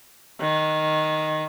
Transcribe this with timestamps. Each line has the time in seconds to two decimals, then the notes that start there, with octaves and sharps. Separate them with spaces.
0.41 D#3